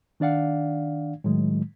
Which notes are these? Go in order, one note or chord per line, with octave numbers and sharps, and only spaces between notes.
D#3 D4 D5 F5 F#5
A2 D#3 F#3 G#3